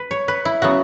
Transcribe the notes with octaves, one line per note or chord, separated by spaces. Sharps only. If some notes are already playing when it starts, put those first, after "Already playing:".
Already playing: B4
C#5
B4
E4
C#3 F#3 B3 F#4